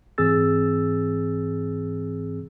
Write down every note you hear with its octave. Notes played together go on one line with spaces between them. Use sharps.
G#2 E3 C4 G#4 E6 A6